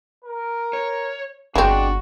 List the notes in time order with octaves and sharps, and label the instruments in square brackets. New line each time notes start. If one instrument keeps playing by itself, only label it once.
[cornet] A#4
[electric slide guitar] C#5
[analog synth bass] G1 [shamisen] G#3 C4 [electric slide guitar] D4 [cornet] F#4